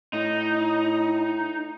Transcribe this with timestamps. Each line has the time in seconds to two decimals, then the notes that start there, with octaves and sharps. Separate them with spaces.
0.13 A2 D#4